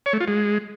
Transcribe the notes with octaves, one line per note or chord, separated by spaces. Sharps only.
C#5
A3
F4
G#3